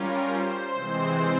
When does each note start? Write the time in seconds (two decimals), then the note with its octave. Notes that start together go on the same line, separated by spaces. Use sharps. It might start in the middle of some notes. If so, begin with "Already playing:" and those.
Already playing: G3 C#4 F4 A#4
0.31 C5
0.72 C3 E3 G#3 C4 C5